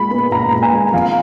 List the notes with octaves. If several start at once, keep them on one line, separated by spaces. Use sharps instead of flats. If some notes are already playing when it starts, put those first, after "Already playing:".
Already playing: A#2 G#3 B5
B3
A#2 A#5
A#2
G#5
G#3
F2 F5